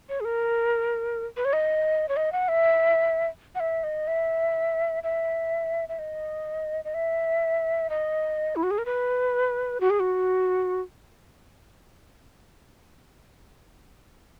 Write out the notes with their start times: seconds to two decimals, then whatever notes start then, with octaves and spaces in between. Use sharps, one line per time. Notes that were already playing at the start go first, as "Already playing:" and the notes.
0.09 C#5
0.20 G#4
0.25 A#4
1.37 B4
1.45 C#5
1.53 D#5
2.09 C#5
2.17 D#5
2.32 F#5
2.48 E5
3.55 F#5
3.60 E5
3.83 D#5
4.07 E5
5.03 E5
5.89 E5
5.99 D#5
6.85 D#5
6.94 E5
7.90 D#5
8.56 E4
8.63 F#4
8.71 G#4
8.78 A#4
8.86 B4
9.81 F#4
9.90 G#4
10.00 F#4